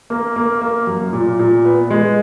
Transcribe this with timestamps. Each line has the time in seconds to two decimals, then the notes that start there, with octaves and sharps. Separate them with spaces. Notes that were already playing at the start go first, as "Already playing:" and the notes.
0.10 A#3
0.36 A#3
0.61 A#3
0.87 F#2
1.13 A#2
1.39 A#2
1.65 B3
1.90 G#3